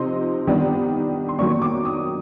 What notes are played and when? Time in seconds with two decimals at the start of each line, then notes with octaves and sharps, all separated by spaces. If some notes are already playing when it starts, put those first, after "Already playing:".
Already playing: C3 F3 D#4 C6
0.47 D#3 G3 B3 D4
1.29 C6
1.39 D#3 F#3 A#3 D4 C#6
1.62 D6
1.85 D#6